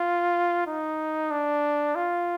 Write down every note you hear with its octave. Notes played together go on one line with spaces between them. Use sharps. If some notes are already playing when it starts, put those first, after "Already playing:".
Already playing: F4
D#4
D4
F4